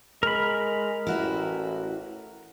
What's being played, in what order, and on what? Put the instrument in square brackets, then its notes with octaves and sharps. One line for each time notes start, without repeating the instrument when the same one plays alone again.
[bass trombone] G#3 [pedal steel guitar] A#4 B5
[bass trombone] A1 [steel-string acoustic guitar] E4 F#4 E5